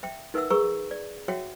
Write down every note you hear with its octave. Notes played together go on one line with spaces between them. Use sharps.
E5 G5
D#4 A#4 B4 E5 F#5 E6
G#4 A#4 B4 A#5 C#6 E6
D5
F#4 C#5 E5 F#5 G5